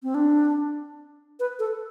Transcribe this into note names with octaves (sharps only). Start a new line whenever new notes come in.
C4
D4
B4
A4